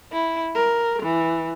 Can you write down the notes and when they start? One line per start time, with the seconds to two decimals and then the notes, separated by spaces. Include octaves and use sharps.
0.13 E4
0.55 A#4
1.02 E3